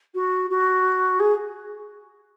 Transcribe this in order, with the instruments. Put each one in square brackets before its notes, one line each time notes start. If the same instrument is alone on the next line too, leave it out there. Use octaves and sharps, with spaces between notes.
[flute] F#4
F#4
G#4